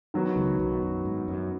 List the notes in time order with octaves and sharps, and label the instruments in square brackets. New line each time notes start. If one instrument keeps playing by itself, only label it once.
[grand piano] D#3 F#3 B3 F#4
[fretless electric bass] C#2 C#3
B1 B2
F#2
G#2
F#2